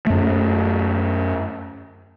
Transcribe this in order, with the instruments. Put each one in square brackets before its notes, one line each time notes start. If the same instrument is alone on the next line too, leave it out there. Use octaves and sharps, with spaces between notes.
[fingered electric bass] F#2 A3